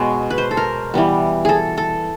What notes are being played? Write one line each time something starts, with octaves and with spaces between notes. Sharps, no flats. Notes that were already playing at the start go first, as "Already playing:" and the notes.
Already playing: B2 G#3 B3 C#5
B4
C5
A4
A#4
E3 G3 B3
G#4 A4
A4